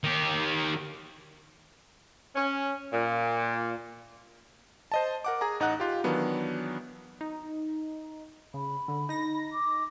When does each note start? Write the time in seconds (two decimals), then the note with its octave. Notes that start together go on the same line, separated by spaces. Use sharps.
0.04 D#3 G4
2.36 C#4
2.93 A#2
4.92 C5 D#5 A5
5.24 A#4 F#5 D6
5.41 G#4 G#5 A#5
5.60 A1 D#4 D#5 F#5 F#6
5.80 F4 G4
6.04 D#3 E3 F#3 B3 D4
7.21 D#4
8.54 C#3 B5
8.88 D3
9.09 D#4 A#6
9.53 D6